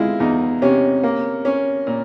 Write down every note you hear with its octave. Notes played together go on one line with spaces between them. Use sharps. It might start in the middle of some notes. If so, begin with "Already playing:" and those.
Already playing: G#3 E4 F4
E2 D#4
C3 C#4
A#3
C#4
A#2